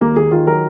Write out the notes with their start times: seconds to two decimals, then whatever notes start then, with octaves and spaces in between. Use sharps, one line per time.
0.01 D#2 A#3
0.16 D#2 G#4
0.31 D#3 F4
0.47 F#3 A#4